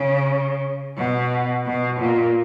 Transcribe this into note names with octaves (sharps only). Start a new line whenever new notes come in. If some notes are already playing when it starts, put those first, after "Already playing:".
Already playing: C#3
B2
B2
A#2